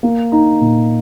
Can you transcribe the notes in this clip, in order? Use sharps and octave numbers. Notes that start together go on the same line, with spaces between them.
A#3
D#4
A#2